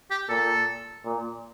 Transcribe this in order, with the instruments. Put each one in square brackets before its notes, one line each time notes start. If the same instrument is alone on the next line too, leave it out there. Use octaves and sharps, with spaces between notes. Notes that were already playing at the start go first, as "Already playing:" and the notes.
[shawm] G4
[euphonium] A#2 [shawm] A4
[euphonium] A#2